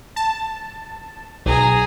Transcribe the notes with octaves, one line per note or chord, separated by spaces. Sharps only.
A5
B1 G#4 A#5